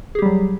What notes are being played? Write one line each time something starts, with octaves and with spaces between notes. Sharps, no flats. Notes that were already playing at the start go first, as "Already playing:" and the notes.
F#3 G3 G4 G#4